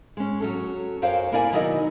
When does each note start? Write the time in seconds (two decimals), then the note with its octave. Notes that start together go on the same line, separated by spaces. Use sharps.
0.17 G#3 C#4
0.40 F#3 C#4 A4
1.02 F#2 F#3 C5 F5 G5
1.32 A#3 E4 A#4 D5 F5 G#5
1.52 B2 D#3 F#3 E4 D#5